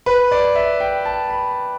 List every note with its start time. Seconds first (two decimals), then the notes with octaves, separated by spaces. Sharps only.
0.06 B4
0.31 D5
0.55 E5
0.80 G5
1.05 A5
1.30 B5